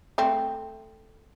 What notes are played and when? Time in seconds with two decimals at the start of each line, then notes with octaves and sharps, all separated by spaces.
0.18 A3 C4